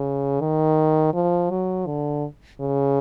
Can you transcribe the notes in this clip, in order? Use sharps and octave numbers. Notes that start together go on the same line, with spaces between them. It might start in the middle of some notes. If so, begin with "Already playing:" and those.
Already playing: C#3
D#3
F3
F#3
D3
C#3